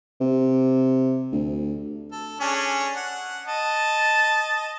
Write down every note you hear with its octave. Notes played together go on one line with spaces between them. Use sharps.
C3
D2
A4
C#4 D4 G#4
F#5
D#5 A5